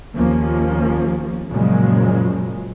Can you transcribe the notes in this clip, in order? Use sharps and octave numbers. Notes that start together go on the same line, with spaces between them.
D#2 F3 A#3 C#4
F#2 A#2 C#3 F3 F#3 G#3